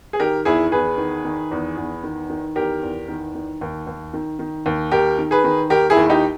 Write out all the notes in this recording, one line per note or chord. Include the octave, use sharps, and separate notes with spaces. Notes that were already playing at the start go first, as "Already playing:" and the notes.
G#4
D#3 G4 A#4
E2 E4 G#4
E2 G#4 B4
D#3
D#3
E2
E2
D#3
D#3
E2 G4 A#4
E2
D#3
D#3
D#2
D#2
D#3
D#3
D#2
D#2 G4 A#4
D#3
G#4 B4
D#3
D#2 G4 A#4
E4 G#4
D#2
E4
D#4 G4